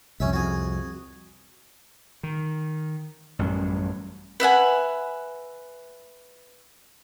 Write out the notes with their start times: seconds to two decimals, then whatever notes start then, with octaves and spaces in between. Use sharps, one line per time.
0.20 C2 F2 C#4 E5
0.33 F#4 G#4
2.23 D#3
3.39 A1 F#2 G3 C#4
4.40 B4 E5 F#5 G#5